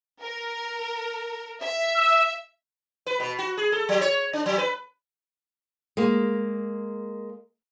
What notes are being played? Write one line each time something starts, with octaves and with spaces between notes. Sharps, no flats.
A#4
E5
E6
B4
B2
F#4
G#4
A4
F#3
C#5
D4
F#3
B4
G#3 A#3